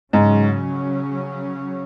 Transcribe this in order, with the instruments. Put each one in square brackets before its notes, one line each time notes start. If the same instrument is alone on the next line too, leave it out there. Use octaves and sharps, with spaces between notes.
[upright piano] G#2 [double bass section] C#3 F#3 C#4